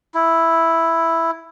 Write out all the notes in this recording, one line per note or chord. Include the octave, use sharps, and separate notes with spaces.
E4